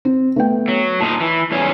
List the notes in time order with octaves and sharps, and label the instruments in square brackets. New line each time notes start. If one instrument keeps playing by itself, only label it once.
[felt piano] C4
A3 B3 G5
[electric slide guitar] F#3
[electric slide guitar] A#2 D#4 [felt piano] A5
[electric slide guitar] E3
E2 G#2 C#4